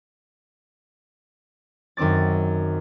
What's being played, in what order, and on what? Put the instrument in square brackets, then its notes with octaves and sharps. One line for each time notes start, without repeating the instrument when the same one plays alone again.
[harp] F#2 D#3 C4 D6 A6